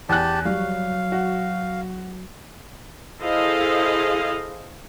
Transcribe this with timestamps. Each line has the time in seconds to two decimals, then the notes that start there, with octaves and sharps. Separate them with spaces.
0.09 E2 G4 G#5 A5 F#6
0.45 F#3 G3 F5
1.12 F#4
3.22 E4 G#4 A4 C5 D#5 F5